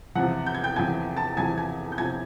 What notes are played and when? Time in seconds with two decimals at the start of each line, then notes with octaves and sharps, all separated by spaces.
0.15 E2 C3 F3 F#5 F#6
0.46 G6
0.55 G#6
0.63 G5 G6
0.76 E2 C3 F3 G#5 G#6
1.17 A5 A6
1.37 E2 C3 F3 G#5 G#6
1.58 G#5 G#6
1.92 G6
1.98 C3 F3 G#5 G#6